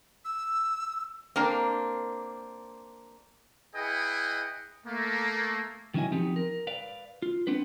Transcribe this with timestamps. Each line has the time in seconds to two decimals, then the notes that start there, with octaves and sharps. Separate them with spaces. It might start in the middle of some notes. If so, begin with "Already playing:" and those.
0.25 E6
1.36 A#3 C4 D4 A#4
3.76 E4 G#4 B4 D#5 F#5 G5
4.87 A3 A#3
5.94 D#3 F#3 C#4 E4 D#5 G#5
6.12 F3 B3 C4 D#4 G4
6.36 A#4
6.67 B4 D5 F5
7.22 F4
7.47 B3 C4 D4 B4